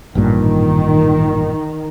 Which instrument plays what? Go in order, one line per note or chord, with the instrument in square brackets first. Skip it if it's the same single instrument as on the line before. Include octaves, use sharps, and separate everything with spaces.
[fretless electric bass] A1 G2 A#2 [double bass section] D#3